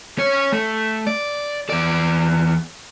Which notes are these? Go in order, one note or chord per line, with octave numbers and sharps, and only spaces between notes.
C#4 C#5
A3
D5
E2 D5